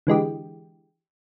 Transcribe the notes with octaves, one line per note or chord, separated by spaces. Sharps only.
D3 E3 G#3 G4